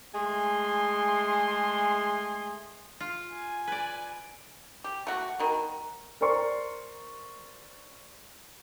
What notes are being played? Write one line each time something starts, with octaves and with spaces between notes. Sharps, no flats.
G#3 A3 G#4 G#5 C6
F4
G#5
B4 D5
G4
A3 F#4
B2 D#3
A#4 C5 D5 A#5 C6 C#6